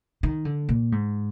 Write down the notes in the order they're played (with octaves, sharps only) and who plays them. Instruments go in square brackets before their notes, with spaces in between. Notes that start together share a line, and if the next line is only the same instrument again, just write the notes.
[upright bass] D#3
D3
A#2
G#2